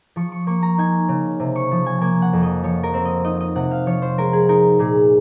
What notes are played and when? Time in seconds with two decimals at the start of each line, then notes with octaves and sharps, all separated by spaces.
0.16 F3 C#6
0.32 C#6
0.47 A#3 C#6
0.63 A#5
0.78 D#4 G#5
1.09 C#3
1.40 C3
1.56 C#6
1.71 F3
1.86 G#5
2.01 A#3 G#5
2.22 F#5
2.33 F2
2.43 D#5
2.63 F3 C#5
2.83 A#4
2.94 C4
3.05 D#5
3.24 D#4 D#5
3.40 D#5
3.55 C3 F#5
3.71 F5
3.86 F3 C#5
4.02 C5
4.18 G#3 A#4
4.33 G#4
4.49 D#4 A#4
4.79 A#2 G#4